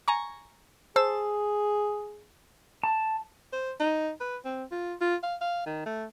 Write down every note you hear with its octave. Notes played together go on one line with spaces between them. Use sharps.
G#5 A#5 C#6
G#4 C5 A5 E6
A5
C5
D#4
B4
C4
F4
F4
F5
F5
D#3
A3